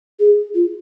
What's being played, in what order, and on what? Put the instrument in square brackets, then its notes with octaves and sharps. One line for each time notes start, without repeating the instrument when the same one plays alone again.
[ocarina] G#4
F4